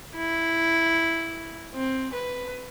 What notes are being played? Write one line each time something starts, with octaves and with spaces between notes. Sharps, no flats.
E4
C4
B4